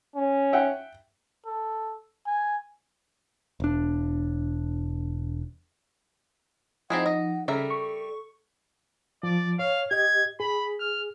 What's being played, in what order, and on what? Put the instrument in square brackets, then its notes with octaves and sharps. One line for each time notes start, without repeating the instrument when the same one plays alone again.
[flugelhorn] C#4
[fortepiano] E5 F#5 G5
[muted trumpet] A4
G#5
[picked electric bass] E1 D4
[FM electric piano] F3 D#4 [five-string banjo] C4 E4 G#4 [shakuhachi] F#5
[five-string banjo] D#5
[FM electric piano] C#3 [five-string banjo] G3 A#4 E5 [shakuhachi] A4
[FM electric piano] C#6
[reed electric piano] F3 [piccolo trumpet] D5
[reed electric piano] C#5 [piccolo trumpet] F5
[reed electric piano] G4 D#5 [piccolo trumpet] G#6
[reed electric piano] G#4 [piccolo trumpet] B5
[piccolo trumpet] F6